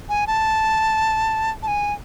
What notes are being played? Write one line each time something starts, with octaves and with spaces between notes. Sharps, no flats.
G#5
A5
A5
G#5